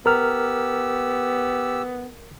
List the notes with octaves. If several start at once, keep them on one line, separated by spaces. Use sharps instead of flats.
B3 G4 A#4 E6 F6